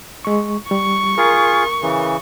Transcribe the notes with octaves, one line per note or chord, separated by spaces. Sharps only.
G#3 C#6
G3 C#6
F4 G#4 A#4
C#3 E3